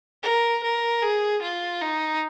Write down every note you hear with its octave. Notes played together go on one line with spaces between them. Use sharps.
A#4
A#4
G#4
F4
D#4